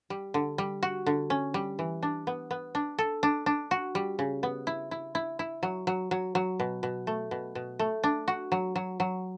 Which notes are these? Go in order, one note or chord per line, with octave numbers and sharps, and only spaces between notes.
G3
D3
G3
F#4
D3
C#4
G3
E3
D4
B3
B3
D4
A4
D4
D4
F#4
G3
C#3
B3
E4
E4
E4
E4
F#3
F#3
F#3
F#3
B2
B2
A3
B2
B2
A3
D4
F#4
F#3
F#3
F#3